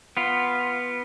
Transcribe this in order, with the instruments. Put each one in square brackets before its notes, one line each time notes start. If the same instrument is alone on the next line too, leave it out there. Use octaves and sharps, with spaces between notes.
[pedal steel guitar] B3 F4